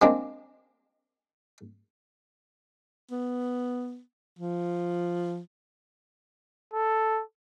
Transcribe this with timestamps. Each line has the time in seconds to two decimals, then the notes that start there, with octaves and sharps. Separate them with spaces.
0.02 G#3 A#3 C4 D4
3.12 B3
4.39 F3
6.74 A4